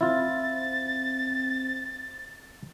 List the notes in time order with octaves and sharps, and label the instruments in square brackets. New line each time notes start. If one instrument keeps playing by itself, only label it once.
[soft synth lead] C4 [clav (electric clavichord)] E4 F4 [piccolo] A6